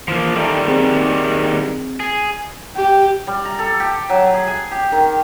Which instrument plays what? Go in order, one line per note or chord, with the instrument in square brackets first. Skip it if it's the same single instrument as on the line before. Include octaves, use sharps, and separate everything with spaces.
[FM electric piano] E3 [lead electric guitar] F3 A#3
[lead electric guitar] D#3 G3 [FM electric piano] A4 E5 A5
[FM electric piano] C4 G#4
[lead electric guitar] G#4
[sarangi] G4
[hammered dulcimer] G3
A#5
A4
G4
F#3
G#4
G#5
G4
D#3